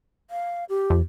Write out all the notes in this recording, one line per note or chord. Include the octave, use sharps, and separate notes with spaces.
F5
G4
F2